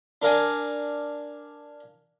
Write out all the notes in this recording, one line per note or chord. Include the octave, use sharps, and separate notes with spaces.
D4 A#4 F5 G#5